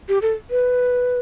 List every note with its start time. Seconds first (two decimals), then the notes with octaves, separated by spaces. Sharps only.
0.09 G4
0.22 A4
0.50 B4